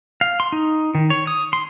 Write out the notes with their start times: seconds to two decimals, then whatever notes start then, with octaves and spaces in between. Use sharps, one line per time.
0.21 F5
0.40 C6
0.52 D#4
0.95 D#3
1.10 C#5
1.27 D#6
1.53 C6